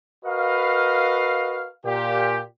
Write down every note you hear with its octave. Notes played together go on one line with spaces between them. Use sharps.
F#4 A#4 B4 D#5 F5
A#2 G4